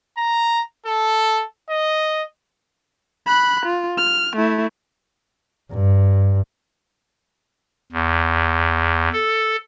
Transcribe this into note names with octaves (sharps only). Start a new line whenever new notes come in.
A#5
A4
D#5
B5 F#6
F4
F6
A3 E4
G2
E2
A4